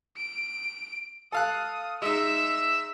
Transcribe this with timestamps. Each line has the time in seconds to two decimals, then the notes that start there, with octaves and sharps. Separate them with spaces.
0.17 D7
1.32 A4 F5 D#6 F#6
2.02 G#3 D#4 E5 E6